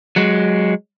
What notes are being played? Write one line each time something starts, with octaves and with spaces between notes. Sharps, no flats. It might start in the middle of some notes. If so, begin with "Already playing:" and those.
F#3 G#3